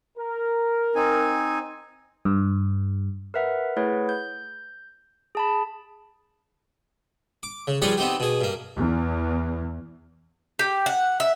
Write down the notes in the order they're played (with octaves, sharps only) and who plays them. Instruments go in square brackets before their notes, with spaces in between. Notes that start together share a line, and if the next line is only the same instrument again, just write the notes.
[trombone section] A#4
[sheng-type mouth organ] C4 D#4 G#5
[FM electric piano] G2
[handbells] A#4 B4 E5 F#5
A3 E4 G#4 B4 C#5 F#5
G6
G#4 A5 B5
[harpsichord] D6
C#3
F3 G3 G#4 B4 C#5 D5
B3 C4 D#4 G4
B2 G#4
G2 A#3
[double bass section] E2
[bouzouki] G4
F#5
E5